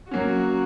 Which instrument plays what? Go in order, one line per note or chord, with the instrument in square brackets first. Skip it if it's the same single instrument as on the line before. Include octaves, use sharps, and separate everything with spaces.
[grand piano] F#3 A#3 C#4 [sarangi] F#4